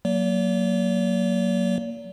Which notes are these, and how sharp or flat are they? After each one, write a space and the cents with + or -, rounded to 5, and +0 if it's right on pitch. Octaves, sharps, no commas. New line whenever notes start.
F#3 +0 A#3 +0 D5 -45